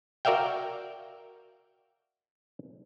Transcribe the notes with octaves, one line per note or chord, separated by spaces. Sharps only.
F#4 A#4 D5 E5 F5 G5